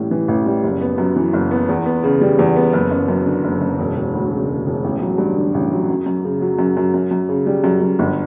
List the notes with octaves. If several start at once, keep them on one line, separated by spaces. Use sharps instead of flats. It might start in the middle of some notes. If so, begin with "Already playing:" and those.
Already playing: A1 A2 G3
E3
A1
G3
F#1
B3
F#2
E3
F#1
B3
E2
B3
C#3
G3
E2
B3
F#1
F#1
F#2
D3
F#1
F#1
E1
E1
D2
C#3
E1
E1
A1
F#3
G2
D3
A1
F#3
F#2
F#2
C#3
F#3
F#2
F#2
F#2
F#2
C#3
G3
F#2
F#2
G1